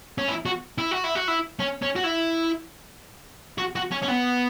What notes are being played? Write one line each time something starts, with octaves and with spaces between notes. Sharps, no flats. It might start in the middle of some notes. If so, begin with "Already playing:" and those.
C#4
E4
F#4
E4
F#4
E4
F#4
E4
C#4
C#4
F#4
E4
F#4
F#4
C#4
C#4
B3